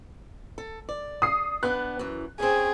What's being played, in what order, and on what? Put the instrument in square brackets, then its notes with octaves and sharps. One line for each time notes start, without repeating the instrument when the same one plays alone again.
[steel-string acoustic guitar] A4
D5
[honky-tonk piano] D#6 C7
[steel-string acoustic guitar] B3 D4 [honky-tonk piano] F#6
[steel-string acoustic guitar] F#2 E3
[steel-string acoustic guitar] C4 C#4 [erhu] G#4